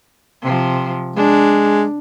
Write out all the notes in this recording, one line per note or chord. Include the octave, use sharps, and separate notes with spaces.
C3 F3
G#3 D4